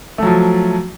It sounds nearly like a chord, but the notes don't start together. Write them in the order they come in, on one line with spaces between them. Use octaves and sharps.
A3 F#3 F3